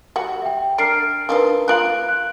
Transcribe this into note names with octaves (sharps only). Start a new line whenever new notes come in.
G3 F#4 F#5
E5 G5
D4 A#4 F6 C7 D7
F3 D4 D#4 A#4 B4
A#3 F4 F5 F#6 D7 F#7
F#6